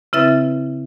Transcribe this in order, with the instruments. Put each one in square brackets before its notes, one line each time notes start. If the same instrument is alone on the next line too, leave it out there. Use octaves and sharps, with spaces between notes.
[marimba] C#3 C4 E4 B4 E5 A6